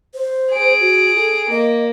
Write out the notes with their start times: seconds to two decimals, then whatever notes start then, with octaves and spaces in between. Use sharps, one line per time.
0.14 C5
0.52 G#4 D7
0.81 F#4
1.16 A4
1.51 A#3 D#5